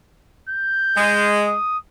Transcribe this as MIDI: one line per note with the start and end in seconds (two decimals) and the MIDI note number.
0.49 1.33 91
0.96 1.54 56
1.47 1.78 87